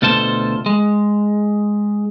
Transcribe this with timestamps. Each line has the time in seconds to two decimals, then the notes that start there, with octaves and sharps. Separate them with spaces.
0.02 D2 B2 F4 A4 C5 A5
0.66 G#3